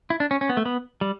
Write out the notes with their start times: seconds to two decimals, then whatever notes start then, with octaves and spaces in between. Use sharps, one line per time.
0.10 E4
0.20 D4
0.31 C#4
0.41 C#4
0.49 B3
0.57 A3
0.65 B3
1.01 G3